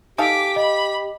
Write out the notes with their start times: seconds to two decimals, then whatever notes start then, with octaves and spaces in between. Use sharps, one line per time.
0.18 D#4 G4 A4 F5 G#5 D6 B6
0.56 D#5 B5